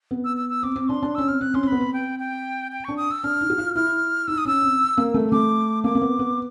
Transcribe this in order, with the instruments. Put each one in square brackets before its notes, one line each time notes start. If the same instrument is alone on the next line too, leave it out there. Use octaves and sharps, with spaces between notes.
[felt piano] B3
[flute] E6
E6
E6
[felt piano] C4 [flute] D6
[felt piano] C4
[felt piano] D4 [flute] C6
[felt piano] D4
[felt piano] C#4 [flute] E6
[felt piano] C4 [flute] F6
[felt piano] C4 [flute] F#6
[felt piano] C#4 [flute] C6
[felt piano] C4
[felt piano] B3 [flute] B5
[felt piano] C4
[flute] G5
G5
G5
[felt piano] D4 [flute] C#6
[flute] D#6
E6
[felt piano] D4 [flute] F6
[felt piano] D#4
F#4
F4
[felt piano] E4 [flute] F6
[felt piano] D#4 [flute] E6
[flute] D#6
[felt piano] C#4 [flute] E6
[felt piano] C4
A#3
A3
[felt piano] A3 [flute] D6
[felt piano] A#3 [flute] D6
[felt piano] A#3
B3
B3